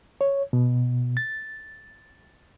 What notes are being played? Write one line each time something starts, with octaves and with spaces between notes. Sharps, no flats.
C#5
B2
A6